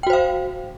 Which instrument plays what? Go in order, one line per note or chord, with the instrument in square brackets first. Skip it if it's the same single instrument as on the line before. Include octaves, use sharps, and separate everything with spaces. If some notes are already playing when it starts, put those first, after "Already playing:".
[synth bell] G5
F#4
C5
F5